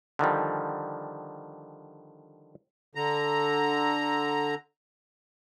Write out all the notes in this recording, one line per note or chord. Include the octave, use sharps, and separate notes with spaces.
D3 D#3 F3 G3
D3 A#5